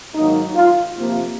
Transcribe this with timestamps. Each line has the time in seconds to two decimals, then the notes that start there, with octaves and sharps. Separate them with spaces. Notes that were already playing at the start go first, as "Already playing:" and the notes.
0.15 G#2 D#3 F#3 A#3 D#4
0.55 F4
0.96 C3 F3 A#3